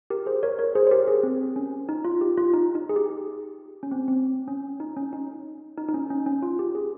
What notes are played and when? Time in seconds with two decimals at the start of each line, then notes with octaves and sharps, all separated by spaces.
0.10 G4 A#4
0.26 G#4 C5
0.43 A#4 C#5
0.59 A#4 C#5
0.75 G#4 C5
0.87 C5
0.91 G4 A#4
1.08 G#4
1.23 C4
1.56 C#4
1.89 D#4
2.04 F4
2.21 G4
2.37 F4
2.54 D#4
2.75 D#4
2.89 G#4
2.96 G4
3.83 C#4
3.91 C4
4.08 C4
4.48 C#4
4.80 D#4
4.97 C#4
5.13 D#4
5.78 D#4
5.88 D#4
5.94 C#4
6.10 C#4
6.26 C#4
6.42 F4
6.59 G4
6.75 G#4